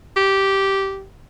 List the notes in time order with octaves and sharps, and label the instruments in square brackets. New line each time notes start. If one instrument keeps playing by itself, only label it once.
[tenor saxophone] G4